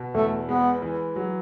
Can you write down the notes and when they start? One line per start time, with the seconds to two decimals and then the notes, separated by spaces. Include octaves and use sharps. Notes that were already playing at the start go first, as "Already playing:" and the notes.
Already playing: B2
0.14 E2 A3
0.49 G#3 B3
0.82 E3
1.16 F#3